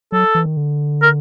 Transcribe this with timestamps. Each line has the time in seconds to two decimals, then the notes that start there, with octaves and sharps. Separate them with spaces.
0.12 F#3 A4
0.35 E3
0.46 D#3
0.57 D3
1.02 A#4